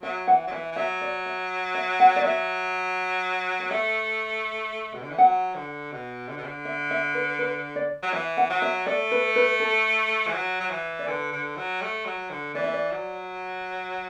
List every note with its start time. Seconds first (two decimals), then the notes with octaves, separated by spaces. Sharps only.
0.02 F#3 E5
0.27 E3 F#5
0.47 F#3
0.52 E3 E5
0.72 E3
0.76 F#3 E5
1.01 D5
1.26 E5
1.75 E5
2.00 F#5
2.16 D5
2.24 F#3 E5
3.60 F#5
3.71 A3 E5
4.94 B2
5.02 D3
5.10 E3
5.18 F#3 F#5
5.55 D3
5.92 B2
6.29 D3
6.37 B2
6.43 D3
6.65 E5
6.91 E5
7.15 B4
7.39 B4
7.76 D5
8.02 F#3
8.13 E3 E5
8.37 F#5
8.50 F#3
8.62 E5
8.86 A3 D5
9.12 B4
9.36 B4
9.60 A4
10.27 E3
10.34 F#3
10.60 F#3
10.70 E3
10.99 D5
11.07 D3 B4
11.32 D3
11.57 F#3
11.82 A3
12.05 F#3
12.30 D3
12.54 E3 D5
12.64 E5
12.73 D5
12.91 F#3